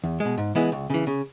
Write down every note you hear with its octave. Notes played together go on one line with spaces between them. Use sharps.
E2
B2 G#3
G#2
E3 G#3 B3 E4
C#2
C#3 E3
C#3